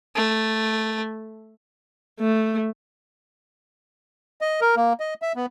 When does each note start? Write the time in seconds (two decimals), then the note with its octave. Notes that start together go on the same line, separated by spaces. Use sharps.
0.15 A3
2.20 A3
4.41 D#5
4.61 A#4
4.76 A#3
5.00 D#5
5.22 E5
5.35 B3